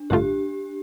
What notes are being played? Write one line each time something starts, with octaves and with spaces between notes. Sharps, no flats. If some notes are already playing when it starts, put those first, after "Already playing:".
Already playing: D4
A1 G2 D3 A3 F4 G4